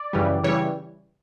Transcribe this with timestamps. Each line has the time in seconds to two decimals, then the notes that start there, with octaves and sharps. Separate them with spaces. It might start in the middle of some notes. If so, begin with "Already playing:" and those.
Already playing: D5
0.13 F#2 C#3 E3 G3
0.44 C#3 E3 G3 C#5